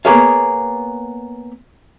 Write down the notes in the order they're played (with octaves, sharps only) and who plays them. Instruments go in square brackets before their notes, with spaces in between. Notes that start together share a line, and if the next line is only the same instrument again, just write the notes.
[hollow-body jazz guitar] A#3 B3 G#4 C#5 F5